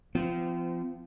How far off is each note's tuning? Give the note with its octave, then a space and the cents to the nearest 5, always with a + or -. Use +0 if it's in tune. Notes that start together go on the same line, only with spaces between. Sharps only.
F3 -25 C4 -40